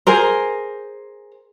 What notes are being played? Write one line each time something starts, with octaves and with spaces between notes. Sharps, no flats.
G#4 A#4 C5